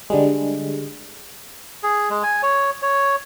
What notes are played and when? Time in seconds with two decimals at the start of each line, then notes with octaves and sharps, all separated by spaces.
0.10 D3 G3 G#3
1.83 G#4
2.10 G#3
2.23 G#5
2.43 C#5
2.82 C#5